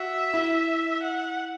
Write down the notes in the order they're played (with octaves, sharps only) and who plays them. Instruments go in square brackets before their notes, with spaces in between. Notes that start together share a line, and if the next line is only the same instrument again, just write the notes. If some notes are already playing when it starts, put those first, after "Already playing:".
Already playing: [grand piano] F#4 [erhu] E5
[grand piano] E4
[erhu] F#5